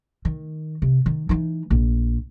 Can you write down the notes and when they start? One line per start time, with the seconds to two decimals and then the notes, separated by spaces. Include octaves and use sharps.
0.25 D#3
0.82 C3
1.06 D#3
1.29 E3 D#4
1.70 A#1